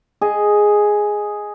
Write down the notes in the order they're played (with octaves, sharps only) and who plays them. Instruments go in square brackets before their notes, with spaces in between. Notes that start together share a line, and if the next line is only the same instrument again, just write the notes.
[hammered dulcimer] G#4 D#5